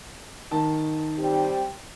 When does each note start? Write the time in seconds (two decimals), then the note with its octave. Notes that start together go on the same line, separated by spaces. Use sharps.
0.51 D#3 A5
1.18 G3 C4 G4